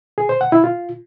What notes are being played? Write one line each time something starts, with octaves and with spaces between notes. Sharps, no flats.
G#4
C5
F#5
E4
F4